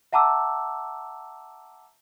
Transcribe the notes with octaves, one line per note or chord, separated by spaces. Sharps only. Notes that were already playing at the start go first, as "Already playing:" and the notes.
E5 F#5 A5 A#5 D6 E6